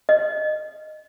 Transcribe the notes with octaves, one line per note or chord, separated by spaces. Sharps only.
D#5